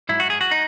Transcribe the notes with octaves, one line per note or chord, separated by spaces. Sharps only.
G#2 F#3 E4
F#4
G#4
F#4
D#4